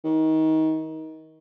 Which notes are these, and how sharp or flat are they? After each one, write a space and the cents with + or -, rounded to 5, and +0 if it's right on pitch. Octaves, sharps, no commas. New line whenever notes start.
D#3 +25